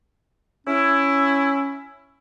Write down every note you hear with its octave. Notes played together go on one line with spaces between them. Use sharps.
C#4 E4